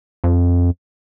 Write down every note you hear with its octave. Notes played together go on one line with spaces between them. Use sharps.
F2